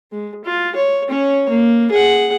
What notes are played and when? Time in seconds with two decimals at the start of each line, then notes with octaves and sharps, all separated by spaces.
0.11 G#3
0.45 F4
0.75 C#5
1.08 C#4 C#5
1.49 A#3
1.91 G#4 F#5